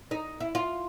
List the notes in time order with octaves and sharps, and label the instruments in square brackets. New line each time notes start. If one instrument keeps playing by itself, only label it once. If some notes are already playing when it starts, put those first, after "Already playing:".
[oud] D#4
E4
F4